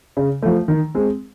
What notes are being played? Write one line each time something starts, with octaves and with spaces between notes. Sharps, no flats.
C#3
F3 A3
D#3
G#3 C4